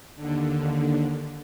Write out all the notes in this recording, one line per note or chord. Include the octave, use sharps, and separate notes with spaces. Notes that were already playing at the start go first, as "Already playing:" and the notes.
D#2 D3